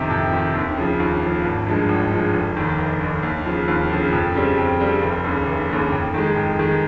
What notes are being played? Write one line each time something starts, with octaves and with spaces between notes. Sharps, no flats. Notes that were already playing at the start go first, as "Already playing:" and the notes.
Already playing: F2 C3 D#3
F2
C3 D#3
D#2
C#3 F3
D#2
C#3 F3
G#1
G2 F3 G#3
G#1
G2 F3 G#3
F1
D#2 D#3
F1
D#2 D#3
D#2
C#3 F3
D#2
C#3 F3
F2
C#3 G3 C4
F2
C#3 G3 C4
F1
D#2 C#3
F1
D#2 C#3
F2
D#3 G#3
F2
D#3 G#3